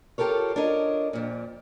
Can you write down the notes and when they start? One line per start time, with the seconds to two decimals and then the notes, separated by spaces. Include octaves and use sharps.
0.18 F4 G4 A4 A#4 C#5
0.56 D4 F4 A#4 C#5 D#5
1.13 F2 A#2